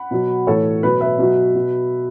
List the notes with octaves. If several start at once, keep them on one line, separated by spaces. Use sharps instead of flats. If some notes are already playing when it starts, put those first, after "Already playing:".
Already playing: F#5 B5
B2 F#3
A2 E3 A4 C#5
B2 F#3 B4
B4 E5
B2 F#3
B2